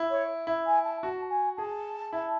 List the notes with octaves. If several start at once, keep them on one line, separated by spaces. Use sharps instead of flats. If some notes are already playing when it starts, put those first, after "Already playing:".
Already playing: E4
C#5
E4
G#5
A5
F#4 A5
G#5
G#4 A5
E4